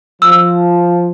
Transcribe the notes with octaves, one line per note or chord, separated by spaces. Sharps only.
F3 E6